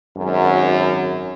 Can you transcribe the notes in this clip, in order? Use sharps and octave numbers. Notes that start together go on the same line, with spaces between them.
G#1 F#2